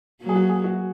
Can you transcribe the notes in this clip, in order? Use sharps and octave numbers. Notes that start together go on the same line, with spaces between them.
F#3 A#3
G#4
F#4
G#4
F#4